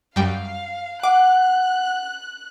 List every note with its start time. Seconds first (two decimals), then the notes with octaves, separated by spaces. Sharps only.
0.16 F#2 G3 F5 G5
1.03 F#5 D6 F#6